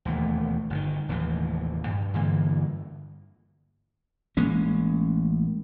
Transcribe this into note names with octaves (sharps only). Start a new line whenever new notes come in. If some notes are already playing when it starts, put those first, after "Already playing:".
E1 D#2 A3
G1 C3 D#3
F1 D#2 A2 E3
G2
G2 D3 E3 A#3
A1 G#3 A#3 C#4